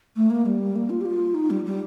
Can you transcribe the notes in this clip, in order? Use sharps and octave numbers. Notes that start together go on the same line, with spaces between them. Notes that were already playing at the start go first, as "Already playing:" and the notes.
A3
A#3
G3
A#3
F4
G4
F4
D#4
G3
G3